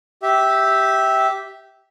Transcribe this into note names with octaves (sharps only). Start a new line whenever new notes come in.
G4 E5